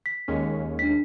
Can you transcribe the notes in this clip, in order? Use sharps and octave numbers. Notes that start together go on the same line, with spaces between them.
B6
D#2 G#3 C#4
D4 B6